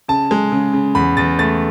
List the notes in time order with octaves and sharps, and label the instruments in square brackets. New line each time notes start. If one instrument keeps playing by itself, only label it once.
[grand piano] C#3 A5
G#3
C#3
C#3
E2 B5
E2 A6
A3 A6